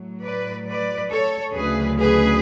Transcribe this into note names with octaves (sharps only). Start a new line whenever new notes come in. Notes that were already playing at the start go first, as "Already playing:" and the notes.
Already playing: A2 F#3
B4 D5
B4 D5
A4 C#5
D2 C#3 F#3 G#4 B4
G#4 B4